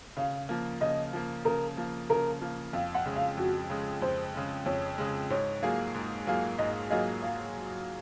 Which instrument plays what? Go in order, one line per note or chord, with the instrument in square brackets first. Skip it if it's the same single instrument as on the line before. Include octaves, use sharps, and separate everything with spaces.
[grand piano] C#3 [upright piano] F5
[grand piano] F3 A#3
[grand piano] C#3 [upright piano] D#5
[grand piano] F3 A#3
[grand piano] C#3 [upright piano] A#4
[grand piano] F3 A#3
[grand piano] C#3 [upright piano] A#4
[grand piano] F3 A#3
[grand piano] F2 [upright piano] F5
[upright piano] F#5
[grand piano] C#3 G#3
[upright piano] F5
[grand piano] F2 [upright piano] F#4
[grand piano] C#3 G#3
[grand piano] F2 [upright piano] C5
[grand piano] C#3 G#3
[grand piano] F2 [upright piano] C#5
[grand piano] C#3 G#3
[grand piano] G#2 [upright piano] C#5
[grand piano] F#3 A#3 F4 G#4
G#2
F#3 A#3 F4 G#4
[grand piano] G#2 [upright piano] D#5
[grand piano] F#3 A#3 F4 G#4 [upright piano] D#5
[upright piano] F5